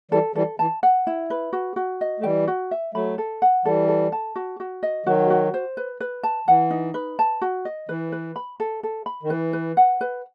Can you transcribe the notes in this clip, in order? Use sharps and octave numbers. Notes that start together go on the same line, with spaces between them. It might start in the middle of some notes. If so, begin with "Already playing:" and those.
E3 G3 A4
E3 G3 A4
E3 A5
F#5
E4
B4
F#4
F#4
D#5
A3
E3 G3 G5
F#4
E5
F#3 A3 B5
A4
F#5
E3 G3 A4
A4
A5
F#4
F#4
D#5
D#3 F#3 F#4
F#4
C5
B4
B4
A5
E3 F#5
D#4
B4
A5
F#4
D#5
E3 B4
B4
B5
A4
A4
B5
D#3
E3 B4
B4
F#5
B4